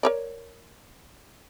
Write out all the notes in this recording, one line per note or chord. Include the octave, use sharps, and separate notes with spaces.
A#4 C#5 D5